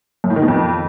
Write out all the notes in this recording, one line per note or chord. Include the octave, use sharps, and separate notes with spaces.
F#2
A2
D#3
B2
F2